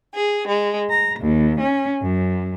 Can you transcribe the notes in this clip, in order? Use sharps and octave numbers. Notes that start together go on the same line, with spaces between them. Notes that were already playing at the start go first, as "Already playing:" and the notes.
G#4
G#3
A#5
D#2
C#4
F#2